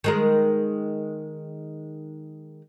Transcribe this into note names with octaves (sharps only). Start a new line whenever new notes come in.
D#3 G#3 A#4